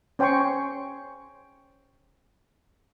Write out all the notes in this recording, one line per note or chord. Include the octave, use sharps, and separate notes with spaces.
C#4 C5 G5 G#5 C6 C#6